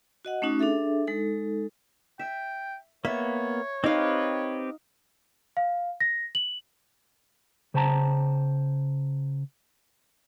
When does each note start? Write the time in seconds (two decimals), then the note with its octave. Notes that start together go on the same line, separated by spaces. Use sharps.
0.25 F#4 D#5 F#5
0.42 A3 C#4 D#4 F#4
0.59 D4 G#4 A4 E5
1.07 G#3 D#4 A4
2.19 E5 G5
3.05 A#3 B3 C#5 E5
3.84 C4 D#4 G4 B4 F5
5.57 F5
6.00 A#6
6.35 F#7
7.74 C#3 C5 G5 A5 A#5